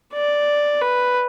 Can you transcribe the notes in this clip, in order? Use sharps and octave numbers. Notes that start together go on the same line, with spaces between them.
D5
B4